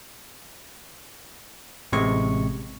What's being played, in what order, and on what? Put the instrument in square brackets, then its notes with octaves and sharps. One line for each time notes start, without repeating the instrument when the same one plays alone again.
[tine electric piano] A1 C3 G#3 C#6